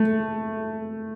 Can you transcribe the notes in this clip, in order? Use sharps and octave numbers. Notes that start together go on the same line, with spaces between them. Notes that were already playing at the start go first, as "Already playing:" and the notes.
Already playing: A3